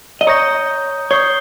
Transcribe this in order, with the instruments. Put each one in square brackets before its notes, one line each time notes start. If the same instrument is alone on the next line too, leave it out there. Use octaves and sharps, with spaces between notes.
[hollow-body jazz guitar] D#5
[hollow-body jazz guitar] C#5 [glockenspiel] A#5 D#6 G6 A#6
[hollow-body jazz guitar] C#5 [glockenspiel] D#6 G6 C7 G7